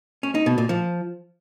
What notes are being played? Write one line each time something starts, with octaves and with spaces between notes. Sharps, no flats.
C#4
D#4
B2
A#2
F3